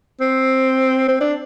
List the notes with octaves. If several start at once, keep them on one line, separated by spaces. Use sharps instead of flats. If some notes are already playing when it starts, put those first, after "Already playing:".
C4
C4
D4